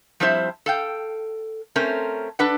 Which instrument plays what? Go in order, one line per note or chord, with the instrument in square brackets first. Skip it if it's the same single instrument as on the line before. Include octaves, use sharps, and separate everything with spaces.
[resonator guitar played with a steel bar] F3 G3 C4 E4 C5 E5
A4 F5 G5
A3 C4 C#4 A#4 C5
D4 A4 B4 D5 F#5